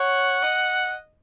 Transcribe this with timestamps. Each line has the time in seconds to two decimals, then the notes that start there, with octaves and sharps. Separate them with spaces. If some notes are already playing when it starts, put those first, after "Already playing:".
Already playing: C#5 F#5
0.44 D#5